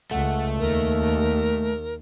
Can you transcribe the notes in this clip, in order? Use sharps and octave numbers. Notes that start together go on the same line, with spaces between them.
C#2 A3 F#5
D#2 A#4